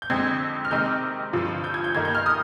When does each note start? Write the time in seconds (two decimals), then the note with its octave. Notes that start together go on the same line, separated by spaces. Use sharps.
0.02 G6
0.10 F2 D3 G#3 C4 G#6
0.65 F6
0.71 C3 D#3 G#3 C4 G6
1.33 G2 D3 F3
1.64 G6
1.74 G#6
1.84 G6
1.95 G2 D#3 A#3 G#6
2.05 G6
2.15 F6
2.26 D#6